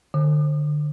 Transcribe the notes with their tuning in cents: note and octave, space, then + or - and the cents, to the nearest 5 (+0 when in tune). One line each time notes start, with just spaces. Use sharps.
D3 +25